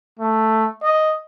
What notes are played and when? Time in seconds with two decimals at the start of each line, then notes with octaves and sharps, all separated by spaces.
0.19 A3
0.83 D#5